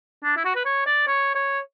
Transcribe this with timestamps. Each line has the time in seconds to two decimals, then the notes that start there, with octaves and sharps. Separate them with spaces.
0.24 D4
0.37 E4
0.45 F#4
0.56 B4
0.65 C#5
0.86 D5
1.07 C#5
1.35 C#5